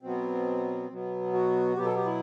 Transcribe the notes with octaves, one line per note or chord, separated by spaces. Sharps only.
B2 F#3 B3 C4
B2 F#3 B3
F#4
B2 F#3 B3 G4
A4
G4
E4